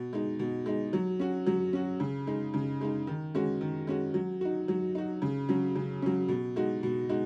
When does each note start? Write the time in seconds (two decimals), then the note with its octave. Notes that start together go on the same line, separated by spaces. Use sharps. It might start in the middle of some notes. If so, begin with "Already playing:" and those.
Already playing: B2
0.13 G#3 D#4
0.39 B2
0.66 G#3 D#4
0.93 F#3
1.19 C#4 F#4
1.46 F#3
1.73 C#4 F#4
2.00 C#3
2.27 G#3 D#4
2.54 C#3
2.81 G#3 D#4
3.07 D#3
3.35 G#3 C#4 F#4
3.61 D#3
3.87 G#3 C#4 F#4
4.14 F#3
4.41 D#4 F#4
4.68 F#3
4.95 D#4 F#4
5.22 C#3
5.49 F#3 C#4
5.75 C#3
6.02 F#3 C#4
6.28 B2
6.56 G#3 D#4 F#4
6.83 B2
7.09 G#3 D#4 F#4